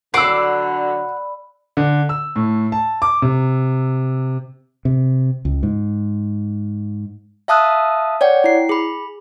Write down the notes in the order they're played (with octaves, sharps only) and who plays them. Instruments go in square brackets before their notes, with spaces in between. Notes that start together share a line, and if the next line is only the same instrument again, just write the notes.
[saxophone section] D3 F#3 [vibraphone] D5 B5 [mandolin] F#5 D6 [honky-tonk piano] E6 C7
[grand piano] D3
E6
A2
A5
D6
C3
[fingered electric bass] C3
C#2
G#2
[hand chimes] E5 F5 A5 D#6 E6 F#6
C#5 D5 F#5 G5
E4 C7
G#4 B5